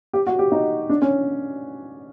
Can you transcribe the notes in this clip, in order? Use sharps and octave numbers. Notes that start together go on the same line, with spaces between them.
G4
F#4
G4
D#4
D4
C#4